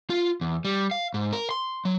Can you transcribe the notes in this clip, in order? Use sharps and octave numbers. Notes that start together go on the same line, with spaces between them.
F4
E2
G3
F5
G#2
A#4
C6
F#3